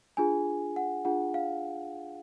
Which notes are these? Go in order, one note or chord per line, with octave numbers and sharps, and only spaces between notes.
D4 F4 G#4 G#5
F#5
D4 F4 G#4 F#5
F5